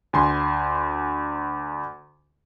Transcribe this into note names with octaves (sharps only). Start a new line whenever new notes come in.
D2 G#5 C6